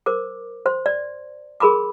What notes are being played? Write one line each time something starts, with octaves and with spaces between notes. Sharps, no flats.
A#4 C5 D6
C5 C6
D5
G#4 A#4 B5 C6 D6